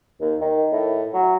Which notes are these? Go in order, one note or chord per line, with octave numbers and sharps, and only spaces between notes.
D#2
D#3
A2
F#3